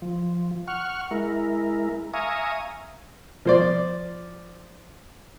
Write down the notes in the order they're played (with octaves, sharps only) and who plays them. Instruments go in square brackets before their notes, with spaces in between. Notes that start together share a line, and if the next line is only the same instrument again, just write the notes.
[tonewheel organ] F3
F#5 C#6 F6
G#3 E4 A#4
E5 F5 G#5 A#5 C#6 D#6
[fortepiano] F3 C5 D5